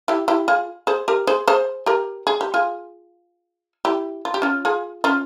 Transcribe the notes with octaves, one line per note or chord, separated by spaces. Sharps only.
E4 G4
E4 G4
F4 G#4
G#4 C5
G4 A#4
G#4 C5
G#4 C5
G4 A#4
G#4
G4
F4 G#4
E4 G4
F4
G4
C#4 F4
F4 G#4
C#4 F4